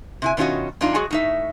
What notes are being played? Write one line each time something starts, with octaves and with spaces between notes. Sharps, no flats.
C3 E4 G#5
B2 D#3 C#4 F4 F#4 D#5
E2 D4 D#4 F4
F#3 G#3 F#4 G#4
A2 D#4 E5